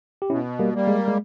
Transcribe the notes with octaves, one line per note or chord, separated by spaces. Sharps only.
G4
B2 C#4 E4
G3 A#3
G3 A#3
G#3
G#3